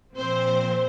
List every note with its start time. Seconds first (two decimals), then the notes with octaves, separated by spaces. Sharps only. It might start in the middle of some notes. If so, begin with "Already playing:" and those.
0.17 A#2 F3 C4 C5